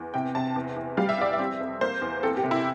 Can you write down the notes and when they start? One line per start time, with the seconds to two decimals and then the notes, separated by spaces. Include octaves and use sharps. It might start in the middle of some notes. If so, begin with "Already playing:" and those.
Already playing: E2
0.14 C3 G5
0.35 C3 A5
0.56 E2
0.76 E2
0.97 G3 F5
1.09 E5
1.18 E2 D5
1.33 E5
1.39 C4
1.61 F2
1.81 A#3 C5
2.02 E2
2.23 C4 A4
2.37 G4
2.44 C3
2.51 E4